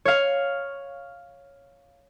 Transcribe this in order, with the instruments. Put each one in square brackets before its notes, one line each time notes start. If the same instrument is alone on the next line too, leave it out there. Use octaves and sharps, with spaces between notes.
[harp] C#5 F5